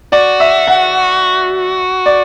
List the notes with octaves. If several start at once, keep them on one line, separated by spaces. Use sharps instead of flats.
F#4 D5
E5
F#5
D5